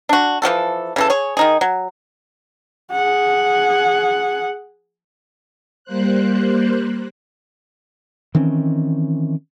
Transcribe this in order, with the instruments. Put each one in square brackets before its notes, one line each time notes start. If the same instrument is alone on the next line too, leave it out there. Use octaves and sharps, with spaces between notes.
[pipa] D4 F#4
E3 F3 F#4 A4
C#3 E3 A4
G#4 C#5
D#3 D#4 G#4
F#3
[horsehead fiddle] G#4 F#5
[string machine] G3 A#3 C5 F#6
[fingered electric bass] D#3 E3 C4 C#4